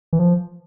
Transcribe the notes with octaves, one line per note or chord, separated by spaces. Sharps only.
E3
F3